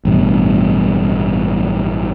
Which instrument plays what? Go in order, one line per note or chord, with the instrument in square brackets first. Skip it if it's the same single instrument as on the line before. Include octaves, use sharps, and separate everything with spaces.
[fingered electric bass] A1 G2 B2